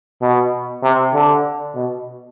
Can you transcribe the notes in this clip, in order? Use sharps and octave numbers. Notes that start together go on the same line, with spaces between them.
B2
C3
D3
B2